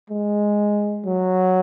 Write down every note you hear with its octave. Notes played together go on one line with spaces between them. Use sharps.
G#3
F#3